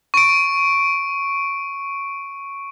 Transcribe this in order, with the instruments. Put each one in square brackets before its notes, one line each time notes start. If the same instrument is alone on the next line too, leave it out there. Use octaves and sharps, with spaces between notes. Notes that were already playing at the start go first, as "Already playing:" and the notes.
[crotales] C#6 D7